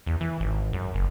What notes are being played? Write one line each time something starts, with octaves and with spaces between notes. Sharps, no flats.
E2
E3
G#1
F#2
F#1